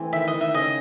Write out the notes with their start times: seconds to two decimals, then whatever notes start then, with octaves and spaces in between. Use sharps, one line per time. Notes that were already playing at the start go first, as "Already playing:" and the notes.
Already playing: E3 A3 C4
0.13 D#3 E5
0.28 D#5
0.34 D#3
0.41 E5
0.54 C#3 D#5